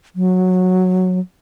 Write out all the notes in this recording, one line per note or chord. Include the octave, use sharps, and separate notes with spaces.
F#3